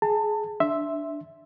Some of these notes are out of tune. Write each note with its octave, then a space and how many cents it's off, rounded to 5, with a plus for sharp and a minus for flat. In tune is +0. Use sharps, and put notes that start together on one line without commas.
G#4 +15 A5 +30
D4 +0 E5 +0 C6 +0